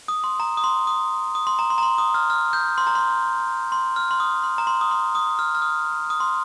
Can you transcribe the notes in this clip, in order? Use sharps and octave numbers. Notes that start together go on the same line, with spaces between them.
D#6
C6
A#5
D#6
C6
D#6
D#6
C6
A#5
C6
A#5
C6
D#6
F6
F6
G6
C6
A#5
C6
C6
F6
C6
D#6
C6
A#5
C6
D#6
C6
D#6
F6
F6
D#6
D#6
C6